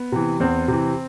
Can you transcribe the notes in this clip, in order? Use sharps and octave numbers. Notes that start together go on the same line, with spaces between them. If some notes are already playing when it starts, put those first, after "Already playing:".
Already playing: B3
C3 E3
E2 C4
C3 E3